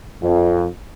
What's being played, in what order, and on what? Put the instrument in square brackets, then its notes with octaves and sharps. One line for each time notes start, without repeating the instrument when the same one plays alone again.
[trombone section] F2